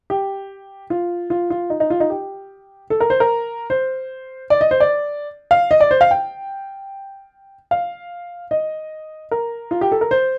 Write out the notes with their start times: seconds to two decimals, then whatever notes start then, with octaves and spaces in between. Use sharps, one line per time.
0.10 G4
0.90 F4
1.30 F4
1.50 F4
1.70 D#4
1.80 D#4
1.90 F4
2.00 D#4
2.10 G4
2.90 A4
3.01 A#4
3.10 C5
3.20 A#4
3.70 C5
4.50 D5
4.61 D#5
4.71 C5
4.80 D5
5.51 F5
5.71 D#5
5.80 D5
5.91 C5
6.01 F5
6.11 G5
7.71 F5
8.51 D#5
9.31 A#4
9.71 F4
9.81 G4
9.92 A4
10.01 A#4
10.11 C5